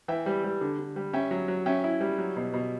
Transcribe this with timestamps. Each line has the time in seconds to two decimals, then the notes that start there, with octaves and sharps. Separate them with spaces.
0.08 E3 E5 G5
0.26 G3
0.44 G3
0.61 D3
0.79 D3
0.96 G3
1.13 C#4 E5 G5
1.31 F#3
1.48 F#3
1.66 C#4 E5 G5
1.84 E4
2.01 G3
2.18 F#3
2.36 B2
2.54 B2